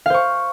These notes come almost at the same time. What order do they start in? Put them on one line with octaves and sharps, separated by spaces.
F5 C5 C#6